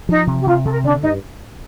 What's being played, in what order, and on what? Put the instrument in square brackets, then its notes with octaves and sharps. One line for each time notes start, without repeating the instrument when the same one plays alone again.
[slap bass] F3 [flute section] D#4
[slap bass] C3
[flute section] G4
[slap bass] C3 [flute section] F4
[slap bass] C3 [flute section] A4
[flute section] A#4
[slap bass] D3 [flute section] D4 D5
[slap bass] G2 [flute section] D#4 D#5